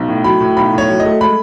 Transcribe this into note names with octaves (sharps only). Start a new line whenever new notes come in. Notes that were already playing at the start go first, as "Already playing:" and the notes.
Already playing: B1
A2
F#3 B5
A2
B1 B5
A2 C#5
F#3
D#5
A3
G#3 B5